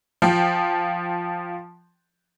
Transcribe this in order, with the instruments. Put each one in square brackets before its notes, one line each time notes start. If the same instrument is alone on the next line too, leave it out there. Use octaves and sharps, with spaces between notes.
[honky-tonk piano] F3 G5